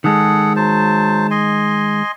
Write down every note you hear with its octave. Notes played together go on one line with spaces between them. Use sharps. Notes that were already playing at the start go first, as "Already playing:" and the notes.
D#3 G#3 G#4 A4 F#5
F#3 C5 A5
D#5 G#5 C6